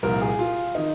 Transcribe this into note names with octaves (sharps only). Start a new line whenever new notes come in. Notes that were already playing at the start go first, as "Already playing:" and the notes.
C2 A#2 F3 A#4
G#4
F4
D#3 D#4